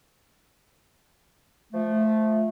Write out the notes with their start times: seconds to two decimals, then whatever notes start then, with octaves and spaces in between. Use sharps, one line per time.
1.73 F3 A3